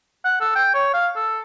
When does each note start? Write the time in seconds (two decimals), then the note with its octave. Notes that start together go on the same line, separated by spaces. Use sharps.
0.25 F#5
0.41 A4
0.55 G5
0.74 C#5
0.94 F5
1.16 A4